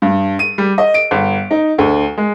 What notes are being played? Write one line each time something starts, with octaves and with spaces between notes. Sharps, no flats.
G2
D#7
G3
D#5
D7
G1
D#4
D2
G#3